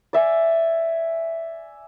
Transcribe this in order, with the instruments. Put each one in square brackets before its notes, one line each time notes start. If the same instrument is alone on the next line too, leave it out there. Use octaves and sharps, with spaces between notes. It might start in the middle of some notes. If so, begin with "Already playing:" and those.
[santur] D5 E5 G#5